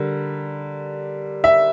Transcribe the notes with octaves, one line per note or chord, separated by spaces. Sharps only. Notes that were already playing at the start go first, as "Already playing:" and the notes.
Already playing: D3 G3 A#4
E5